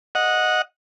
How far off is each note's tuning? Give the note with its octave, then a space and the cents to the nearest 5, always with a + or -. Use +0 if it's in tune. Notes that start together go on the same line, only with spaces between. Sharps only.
D#5 +0 F#5 -15